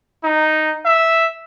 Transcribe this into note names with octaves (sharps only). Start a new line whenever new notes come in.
D#4
E5